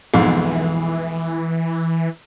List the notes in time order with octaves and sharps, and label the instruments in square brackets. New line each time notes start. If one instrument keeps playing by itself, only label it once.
[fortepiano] B1 F2 G#2 [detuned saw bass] E3